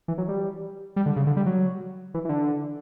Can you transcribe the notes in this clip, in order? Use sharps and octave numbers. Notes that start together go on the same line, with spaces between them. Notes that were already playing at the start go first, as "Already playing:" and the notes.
E3
F#3
G3
G3
D3
C#3
D3
G3
F#3
E3
E3
D3